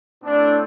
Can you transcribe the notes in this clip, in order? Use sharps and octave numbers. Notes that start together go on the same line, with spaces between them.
A2 A3 C4 D4